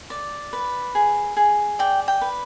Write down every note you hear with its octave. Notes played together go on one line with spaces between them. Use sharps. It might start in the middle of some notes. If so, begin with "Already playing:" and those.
D5
B4
G#4
G#4
D5 G5
G5
B4